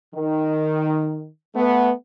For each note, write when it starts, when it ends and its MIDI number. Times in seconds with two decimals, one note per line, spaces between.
0.15 1.27 51
1.55 1.91 57
1.55 1.91 59